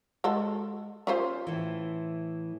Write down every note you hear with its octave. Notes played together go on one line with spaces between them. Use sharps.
G#3 F#4 A4
C#4 F4 C5
A2 E3